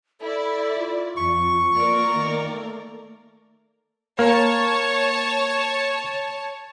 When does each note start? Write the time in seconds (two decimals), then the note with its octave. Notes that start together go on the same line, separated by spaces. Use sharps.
0.21 E4 A4 D5
0.78 F4
1.17 F2 C#6
1.73 A#3 A#4 D5
2.14 D#3
2.52 A3
4.19 A#3 C#5 A5